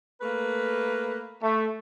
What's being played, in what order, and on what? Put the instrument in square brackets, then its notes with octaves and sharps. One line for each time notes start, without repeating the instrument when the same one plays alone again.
[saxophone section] A3 A#3 B4
[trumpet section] A3